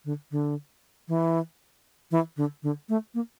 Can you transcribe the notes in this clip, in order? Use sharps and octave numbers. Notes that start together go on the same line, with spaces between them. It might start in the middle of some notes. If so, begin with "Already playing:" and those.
D3
D3
E3
E3
D3
D3
A3
A#3